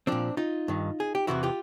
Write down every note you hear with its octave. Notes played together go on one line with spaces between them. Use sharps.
A#2 F3 C4 D4
D#4 F4
G2 D#3
G#4
G4
E2 C3 E3 E4 F#4
F4 G4